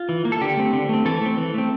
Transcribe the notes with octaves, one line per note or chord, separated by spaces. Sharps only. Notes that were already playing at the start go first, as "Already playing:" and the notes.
Already playing: F4
E3
A#3
A4
D3 G4
A3 C4
D3
A3 C4
E3 A4
A3 C4
E3
A3 C4